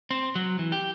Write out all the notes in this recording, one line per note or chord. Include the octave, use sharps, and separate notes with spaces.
C4
F#3
E3
G4